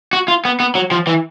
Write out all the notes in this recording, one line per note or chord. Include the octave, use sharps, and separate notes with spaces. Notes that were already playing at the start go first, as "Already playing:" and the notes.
F#4
F4
B3
B3
F#3
F3
E3